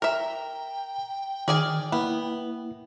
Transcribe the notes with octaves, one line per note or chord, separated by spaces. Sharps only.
A#4 E5 G5 A#5
D#3 G#4 D5 G#5 F6
A#3 B3 E4